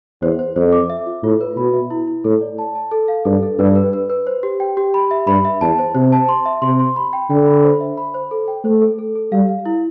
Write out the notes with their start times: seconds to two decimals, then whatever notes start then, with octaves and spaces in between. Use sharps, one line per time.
0.22 E2 C5
0.39 C5
0.56 F2 C5
0.72 D6
0.90 E5
1.06 F4
1.23 A2 F4
1.41 B4
1.57 B2 B5
1.74 E5
1.90 E4
2.08 E4
2.24 A2 A4
2.41 D5
2.58 A5
2.75 A5
2.91 A4
3.08 F5
3.25 G2 A4
3.43 A4
3.59 G2 B4
3.76 B4
3.93 B4
4.09 B4
4.27 C5
4.43 G4
4.60 G5
4.77 G4
4.94 B5
5.11 E5
5.27 G2 B5
5.45 E5
5.61 E2 A5
5.79 C5
5.95 C3 C5
6.12 A5
6.29 C6
6.46 E5
6.62 C3 C6
6.79 C6
6.96 B5
7.13 G5
7.30 D3 G5
7.47 B5
7.64 C5
7.80 E5
7.97 B5
8.14 C5
8.31 A4
8.48 G5
8.64 A3 C5
8.82 A4
8.99 A4
9.15 A4
9.32 G3 F5
9.49 F5
9.66 E4